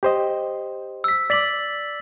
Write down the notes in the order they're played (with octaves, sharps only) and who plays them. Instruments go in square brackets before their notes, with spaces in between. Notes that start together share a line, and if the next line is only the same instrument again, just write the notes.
[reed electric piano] G4 C5 D#5
[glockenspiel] E6 B6
[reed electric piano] D5 D6 [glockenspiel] A6 B6 F#7